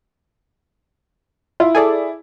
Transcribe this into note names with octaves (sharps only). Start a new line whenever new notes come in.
E4 F4
G#4 A4 D5